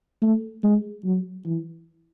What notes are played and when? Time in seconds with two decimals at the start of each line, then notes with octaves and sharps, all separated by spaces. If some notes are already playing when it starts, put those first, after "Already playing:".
0.22 A3
0.63 G#3
1.04 F#3
1.45 E3